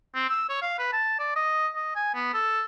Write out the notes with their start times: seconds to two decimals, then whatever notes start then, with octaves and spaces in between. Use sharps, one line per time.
0.15 C4
0.30 E6
0.49 C#5
0.62 F5
0.79 B4
0.93 A5
1.19 D5
1.36 D#5
1.75 D#5
1.96 G#5
2.14 B3
2.34 A4